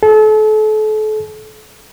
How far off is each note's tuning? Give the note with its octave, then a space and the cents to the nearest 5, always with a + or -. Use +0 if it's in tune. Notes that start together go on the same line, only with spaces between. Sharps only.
A4 -35